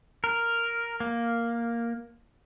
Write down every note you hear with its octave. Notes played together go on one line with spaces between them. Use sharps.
A#4
A#3